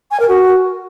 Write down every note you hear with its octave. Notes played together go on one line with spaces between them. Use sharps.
G#5
A#4
F#4